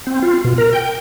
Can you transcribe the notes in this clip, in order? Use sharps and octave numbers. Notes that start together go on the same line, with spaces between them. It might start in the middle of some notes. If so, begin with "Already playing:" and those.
C4
F4
B2
A#4
G5